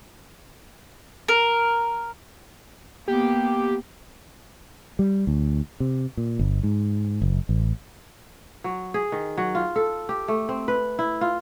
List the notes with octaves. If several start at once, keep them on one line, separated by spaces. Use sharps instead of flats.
A#4
A#3 B3 G4
G3
D2
C3
A#2
G1
G#2
F#1
A1
F#3
G#4
D#3
F#3
F4
A4
G4
A3
C4
B4
E4
F4